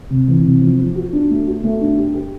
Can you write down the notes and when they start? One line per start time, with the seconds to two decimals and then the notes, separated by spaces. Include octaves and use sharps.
0.10 C3
0.28 E3
0.44 C3
0.61 F3
0.79 F3
0.96 F#4
1.13 D4
1.30 A3
1.47 F#4
1.64 A3
1.81 D4
1.98 G4
2.14 G4